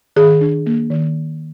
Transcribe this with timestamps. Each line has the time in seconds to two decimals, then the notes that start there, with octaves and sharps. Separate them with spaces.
0.16 D#3 G#4
0.41 D4
0.66 A#3
0.91 D#3